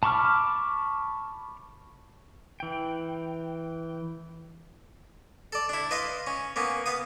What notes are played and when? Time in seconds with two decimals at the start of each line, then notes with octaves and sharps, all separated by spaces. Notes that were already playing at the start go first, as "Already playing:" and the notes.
0.03 A5 B5 C#6 D6 F6
2.60 E3 G5
5.52 A4 D5
5.69 D4 E4
5.91 B4 D#5 F5 C6
6.27 C#4
6.56 A#3 B3 C#4
6.86 B3 F5 D#6